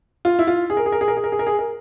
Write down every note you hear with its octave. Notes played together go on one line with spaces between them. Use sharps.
F4
E4
F4
G#4
A#4
G#4
A#4
G#4
A#4
G#4
A#4
G#4
A#4
G#4
A#4